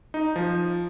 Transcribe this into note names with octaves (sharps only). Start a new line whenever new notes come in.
D#4
F3